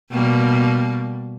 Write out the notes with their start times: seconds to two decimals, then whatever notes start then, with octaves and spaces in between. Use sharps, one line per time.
0.11 B2 G3 A#3